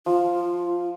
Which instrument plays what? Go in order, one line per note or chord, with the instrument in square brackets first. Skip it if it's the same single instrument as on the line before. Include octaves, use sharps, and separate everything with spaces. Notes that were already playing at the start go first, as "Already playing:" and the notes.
[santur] F3 [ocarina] F4